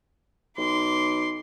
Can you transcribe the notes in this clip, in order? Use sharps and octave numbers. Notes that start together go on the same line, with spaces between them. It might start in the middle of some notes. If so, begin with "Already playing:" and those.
B1 C6 D6